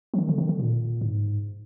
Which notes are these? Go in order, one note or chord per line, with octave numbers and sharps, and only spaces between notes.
F3
D#3
D3
D#3
D3
A#2
G#2